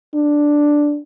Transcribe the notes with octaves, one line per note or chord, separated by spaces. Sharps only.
D4